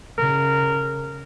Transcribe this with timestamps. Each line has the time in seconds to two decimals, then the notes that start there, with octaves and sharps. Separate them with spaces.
0.18 C#3 A#4